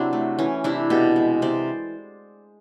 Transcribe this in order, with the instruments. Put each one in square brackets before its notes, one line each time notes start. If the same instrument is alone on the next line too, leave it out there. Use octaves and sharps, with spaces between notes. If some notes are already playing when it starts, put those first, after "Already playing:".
Already playing: [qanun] C3 F#3 C4 D4 E4 F#4
A3
E3 C#4
C3 D4 E4
B2 G4 A4
G#3
C3 C5 D5